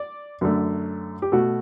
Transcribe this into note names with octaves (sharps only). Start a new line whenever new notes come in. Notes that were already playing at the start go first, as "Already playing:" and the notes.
Already playing: D5
F#2 D3 A3
G4
B2 A3 F#4